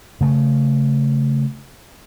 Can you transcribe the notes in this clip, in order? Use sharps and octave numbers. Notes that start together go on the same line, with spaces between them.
C#3 A3